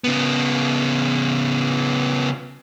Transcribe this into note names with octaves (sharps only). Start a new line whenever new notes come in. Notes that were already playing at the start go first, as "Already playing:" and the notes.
C#3 B3